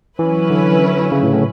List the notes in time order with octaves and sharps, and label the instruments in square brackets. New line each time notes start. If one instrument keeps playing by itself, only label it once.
[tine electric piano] E3 [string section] F#3 C#4 E4 B4
[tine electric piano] D3
C#3
A2
A2